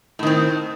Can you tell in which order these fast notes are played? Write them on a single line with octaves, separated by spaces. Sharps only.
A2 D#3 C4